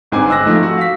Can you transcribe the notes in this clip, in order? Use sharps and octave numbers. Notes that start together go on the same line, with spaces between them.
G1 G#2 C4 G#5 D6
E6 F#6 A#6
F3 A3 D#4
F#4
F5 B6